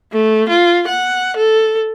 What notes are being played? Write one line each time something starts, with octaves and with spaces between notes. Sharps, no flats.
A3
F4
F#5
A4